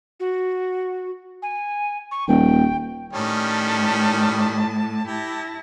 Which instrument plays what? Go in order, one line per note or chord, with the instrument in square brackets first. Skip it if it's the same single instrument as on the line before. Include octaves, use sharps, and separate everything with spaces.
[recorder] F#4
G#5
C#6
[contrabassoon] D#1 [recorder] G5
[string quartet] A2 A5 [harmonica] D#3 G3 C#4
[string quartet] E4 A5 A#6 [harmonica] G4